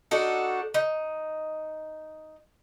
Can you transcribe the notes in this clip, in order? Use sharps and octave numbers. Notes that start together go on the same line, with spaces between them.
D4 D#4 F#4 A4
D#4